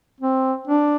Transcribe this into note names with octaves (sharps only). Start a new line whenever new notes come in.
C4
D4